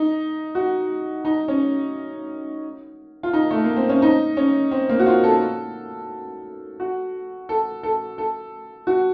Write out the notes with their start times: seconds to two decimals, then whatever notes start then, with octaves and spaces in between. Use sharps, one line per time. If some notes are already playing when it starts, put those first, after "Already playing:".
Already playing: D#4
0.55 F#4
1.25 D#4
1.48 C#4
3.23 F4
3.33 D#4
3.51 A3
3.64 A#3
3.76 C4
3.89 C#4
4.02 D#4
4.37 C#4
4.71 C4
4.89 A#3
4.99 F#4
5.06 F4
5.24 A4
6.80 F#4
7.49 A4
7.83 A4
8.18 A4
8.87 F#4